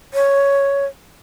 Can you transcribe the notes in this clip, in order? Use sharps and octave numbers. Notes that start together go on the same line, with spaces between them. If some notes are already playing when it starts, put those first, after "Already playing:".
C#5